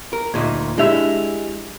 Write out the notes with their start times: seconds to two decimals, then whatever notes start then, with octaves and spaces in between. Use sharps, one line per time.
0.13 A#4
0.34 D2 A#2 D#4 G#6
0.78 G#3 D4 E4 G4 E5 F7